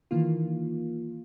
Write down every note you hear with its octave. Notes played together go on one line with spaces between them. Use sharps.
D#3 E3 A#3 F4